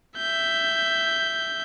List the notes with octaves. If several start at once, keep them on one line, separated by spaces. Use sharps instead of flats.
E5 G6